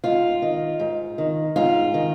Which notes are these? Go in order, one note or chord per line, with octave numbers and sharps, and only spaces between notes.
G#2 F4
D#3
G#2
D#3
G#2 F4
D#3